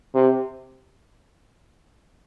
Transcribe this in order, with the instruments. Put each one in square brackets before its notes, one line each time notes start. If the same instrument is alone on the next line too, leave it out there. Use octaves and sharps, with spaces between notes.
[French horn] C3